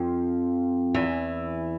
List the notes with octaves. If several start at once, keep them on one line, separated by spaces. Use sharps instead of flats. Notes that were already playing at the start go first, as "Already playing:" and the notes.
Already playing: F2 F3
E2 E3